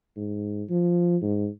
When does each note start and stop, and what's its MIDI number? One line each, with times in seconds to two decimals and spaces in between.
0.17 0.63 44
0.69 1.17 53
1.22 1.48 44